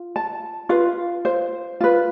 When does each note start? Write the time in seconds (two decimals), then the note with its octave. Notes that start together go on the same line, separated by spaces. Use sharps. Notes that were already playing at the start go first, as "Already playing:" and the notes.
Already playing: F4
0.16 A5
0.69 F4 B4 F5
1.25 C5
1.81 F4 B4